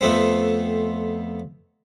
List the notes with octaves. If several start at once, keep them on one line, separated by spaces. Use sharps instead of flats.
F2 A3 B3 C4